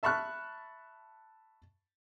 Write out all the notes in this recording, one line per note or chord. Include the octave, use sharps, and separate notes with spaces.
E5 A5 B5 C#6 F6 F#6